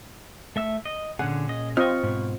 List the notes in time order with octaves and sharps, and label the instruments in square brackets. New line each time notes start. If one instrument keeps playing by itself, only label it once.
[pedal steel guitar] A3 E5 E6
D#5
[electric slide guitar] A#2 C#4 G#4 [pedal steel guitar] D3 [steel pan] F#5
[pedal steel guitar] D#5
[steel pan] C4 F4 D#5 [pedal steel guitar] C#6 F6
[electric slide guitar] G#2 B2